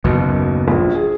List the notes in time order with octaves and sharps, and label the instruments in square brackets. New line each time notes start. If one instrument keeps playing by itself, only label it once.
[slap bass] F#1 D#2 [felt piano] B2
[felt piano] A#1
G#4